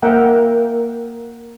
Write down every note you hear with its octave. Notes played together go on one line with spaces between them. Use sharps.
A#3 A#4 E5 F#5 G5